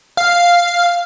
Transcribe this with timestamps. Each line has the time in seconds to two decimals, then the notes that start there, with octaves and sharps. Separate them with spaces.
0.17 F5